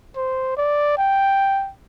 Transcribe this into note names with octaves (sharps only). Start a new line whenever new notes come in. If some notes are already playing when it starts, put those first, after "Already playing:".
C5
D5
G5